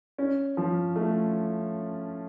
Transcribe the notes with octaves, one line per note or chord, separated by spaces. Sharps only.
C#4
F3
A3